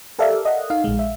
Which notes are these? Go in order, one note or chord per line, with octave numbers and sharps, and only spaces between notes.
G4 A4 A#4 D5 E5 F5
D#5 F#5
D#4 F5
A#1 G#3
E5